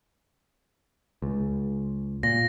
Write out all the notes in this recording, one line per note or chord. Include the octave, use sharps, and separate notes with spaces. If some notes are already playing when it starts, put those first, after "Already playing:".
C#2
A#2 A#6